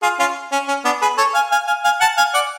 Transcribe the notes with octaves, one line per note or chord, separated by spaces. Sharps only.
F4 G#4
C#4 F4
C#4
C#4
B3 D4
G#4 B4
A4 C#5
F5 G#5
F5 G#5
F5 G#5
F5 G#5
F#5 A5
F5 G#5
D5 F#5